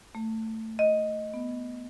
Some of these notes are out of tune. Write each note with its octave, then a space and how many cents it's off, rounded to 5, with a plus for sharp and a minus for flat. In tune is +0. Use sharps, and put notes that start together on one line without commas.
A3 +15
D#5 +5
B3 +0